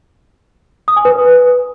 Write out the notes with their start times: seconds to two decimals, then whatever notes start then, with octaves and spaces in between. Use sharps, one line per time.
0.88 D#6
0.96 G#5
1.05 B4